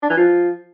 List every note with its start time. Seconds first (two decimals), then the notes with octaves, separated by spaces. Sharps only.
0.02 D4
0.10 E3
0.17 F3